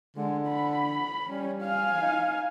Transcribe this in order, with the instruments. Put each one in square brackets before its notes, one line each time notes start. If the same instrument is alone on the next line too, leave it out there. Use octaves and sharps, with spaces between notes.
[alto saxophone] D3 [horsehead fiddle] G#3
[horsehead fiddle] B5
[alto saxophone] G3 [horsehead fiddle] C#4
[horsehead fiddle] F5 G#5
[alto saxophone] D#4